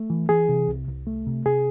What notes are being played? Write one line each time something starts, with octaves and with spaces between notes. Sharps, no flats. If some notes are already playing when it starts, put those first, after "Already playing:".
Already playing: A3
E3
E3 G#4
C3
C2
C2
A3
C3
C3 G#4